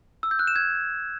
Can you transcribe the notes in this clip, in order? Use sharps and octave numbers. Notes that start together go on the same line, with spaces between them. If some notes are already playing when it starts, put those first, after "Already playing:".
E6
G6
F#6
E7
G#6